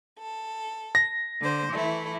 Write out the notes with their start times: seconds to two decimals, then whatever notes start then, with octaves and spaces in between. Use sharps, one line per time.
0.19 A4
0.95 A#6
1.41 D3 C5
1.73 E3 A3 E4